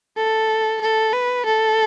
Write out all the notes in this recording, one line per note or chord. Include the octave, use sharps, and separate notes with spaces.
A4
A4
B4
A4